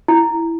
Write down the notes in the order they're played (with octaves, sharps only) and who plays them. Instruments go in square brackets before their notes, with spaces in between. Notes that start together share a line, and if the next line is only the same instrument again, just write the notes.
[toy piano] E4